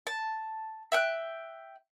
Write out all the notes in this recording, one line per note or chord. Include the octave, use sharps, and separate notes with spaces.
A5
E5 G5 F#6